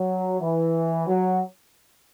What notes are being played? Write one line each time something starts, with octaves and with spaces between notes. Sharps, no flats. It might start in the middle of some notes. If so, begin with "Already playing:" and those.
Already playing: F#3
E3
F#3